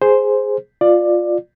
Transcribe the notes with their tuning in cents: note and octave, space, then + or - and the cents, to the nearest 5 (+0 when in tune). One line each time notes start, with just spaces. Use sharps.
G#4 +0 C5 +0
F4 +10 D5 +15